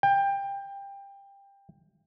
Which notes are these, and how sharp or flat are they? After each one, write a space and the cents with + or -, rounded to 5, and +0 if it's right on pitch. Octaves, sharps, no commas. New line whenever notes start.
G5 +20